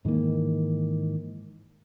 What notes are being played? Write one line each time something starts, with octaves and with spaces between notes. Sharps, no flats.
G#2 D#3 E3 A#3